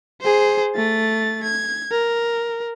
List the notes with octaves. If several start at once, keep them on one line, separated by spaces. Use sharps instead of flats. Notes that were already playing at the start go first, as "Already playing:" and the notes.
G#4 C5
A3 A6
G#6
A#4